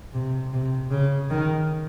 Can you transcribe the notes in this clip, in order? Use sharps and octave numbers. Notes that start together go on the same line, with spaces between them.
C3
C3
C#3
D#3